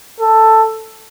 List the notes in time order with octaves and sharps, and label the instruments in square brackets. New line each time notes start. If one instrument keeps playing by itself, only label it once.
[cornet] A4